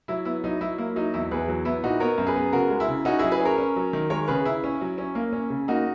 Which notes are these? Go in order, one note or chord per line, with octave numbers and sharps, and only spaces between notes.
F#3 E4
B3 E4
F#3 D#4
F#3 E4
A#3 E4
F#3 D#4
E2 E4
E2 G#4 B4
F#3
B3 E4
A#2 D#4 F#4
B3 A#4 C#5
F#2
G#4 B4
B3
C#3 F#4 A#4
G#3
E4
C#3
C#4 D#4 F#4
F#3 E4 G#4
G#4 B4
C#4
A#4 C#5
C#4
F#3
D#3
G#3 A#4 C#5
C#3 G#4 B4
C#3 E4
C#4
F#3
C#4
A#3
C#4
C#3
A#3 D#4 F#4